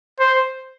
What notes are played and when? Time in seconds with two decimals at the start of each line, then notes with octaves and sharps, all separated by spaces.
0.20 C5